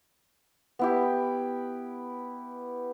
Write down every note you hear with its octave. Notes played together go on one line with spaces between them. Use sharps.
B3 E4 G4